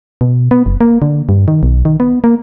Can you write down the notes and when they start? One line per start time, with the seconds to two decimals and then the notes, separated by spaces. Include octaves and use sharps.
0.21 B2
0.51 B3
0.66 F#1
0.81 A#3
1.02 D3
1.29 G2
1.48 D#3
1.63 B1
1.85 D#3
2.00 B3
2.24 A#3